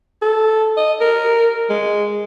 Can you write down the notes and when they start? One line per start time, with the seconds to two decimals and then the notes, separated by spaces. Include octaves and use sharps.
0.22 A4
0.77 D#5
1.01 A#4
1.70 G#3